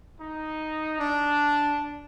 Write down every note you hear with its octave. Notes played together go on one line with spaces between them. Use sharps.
D#4
D4